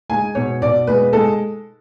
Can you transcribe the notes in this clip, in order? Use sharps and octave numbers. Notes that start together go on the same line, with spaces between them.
G#3 G#5
B2 C#5
B2 D5
G#3 B4
G#3 A4